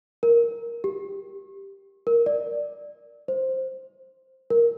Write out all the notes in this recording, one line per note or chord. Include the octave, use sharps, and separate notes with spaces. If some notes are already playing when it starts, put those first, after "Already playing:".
A#4
G4
A#4
D5
C5
A#4